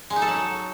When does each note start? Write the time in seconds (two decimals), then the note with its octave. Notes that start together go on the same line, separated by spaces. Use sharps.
0.10 G#3
0.16 D#4
0.22 A4
0.28 F#3